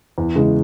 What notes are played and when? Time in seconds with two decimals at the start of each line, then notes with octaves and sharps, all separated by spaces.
0.18 E2
0.35 C#3 E3 G#3